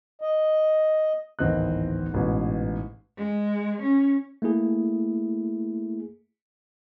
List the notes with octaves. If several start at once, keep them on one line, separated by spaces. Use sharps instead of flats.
D#5
D1 G#1 E2 C4 D#5 F#6
A1 G#2 B2
G#3
C#4
A3 A#3 E4 G#4